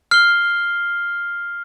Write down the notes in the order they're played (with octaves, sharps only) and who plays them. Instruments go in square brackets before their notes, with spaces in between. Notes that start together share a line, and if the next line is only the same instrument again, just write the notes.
[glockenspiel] F6 C7 G7